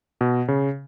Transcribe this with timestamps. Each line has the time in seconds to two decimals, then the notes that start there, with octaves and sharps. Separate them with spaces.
0.21 B2
0.48 C#3